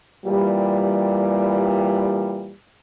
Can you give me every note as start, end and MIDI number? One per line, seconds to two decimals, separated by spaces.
0.26 2.53 46
0.26 2.53 52
0.26 2.53 55